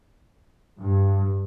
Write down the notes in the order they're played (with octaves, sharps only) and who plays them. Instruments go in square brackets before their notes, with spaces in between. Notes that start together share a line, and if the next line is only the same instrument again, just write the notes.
[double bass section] G2